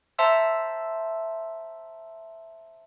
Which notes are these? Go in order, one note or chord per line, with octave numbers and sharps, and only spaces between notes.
C5 E5 A5 A#5 C6 E6